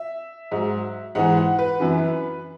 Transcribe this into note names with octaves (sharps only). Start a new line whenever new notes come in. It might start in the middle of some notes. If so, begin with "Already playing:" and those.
Already playing: E5
G#2 F#3
G#2 E3 F#5
F#5
B4
F#2 E3